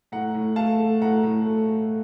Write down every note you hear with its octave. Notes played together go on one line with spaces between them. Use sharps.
A2 F#5 A#5
A2
A3 F5 A5
A3
A2 F#5 A#5
A2
A3
A3